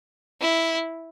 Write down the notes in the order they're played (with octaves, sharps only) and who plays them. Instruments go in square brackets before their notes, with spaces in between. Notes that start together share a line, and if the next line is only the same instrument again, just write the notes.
[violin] E4